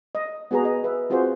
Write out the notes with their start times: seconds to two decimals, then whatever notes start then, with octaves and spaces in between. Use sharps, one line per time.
0.15 D#5
0.51 B3 F#4 G#4 B4 A#5
0.65 D#5
0.84 B4 E5
1.10 C4 F4 F#4 G#4 C5